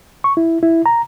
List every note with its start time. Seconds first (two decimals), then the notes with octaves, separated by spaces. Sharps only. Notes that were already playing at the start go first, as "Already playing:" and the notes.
0.24 C#6
0.37 E4
0.63 E4
0.86 A#5